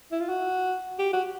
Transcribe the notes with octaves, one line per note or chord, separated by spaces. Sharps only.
E4
F4
F#4
G4
F#4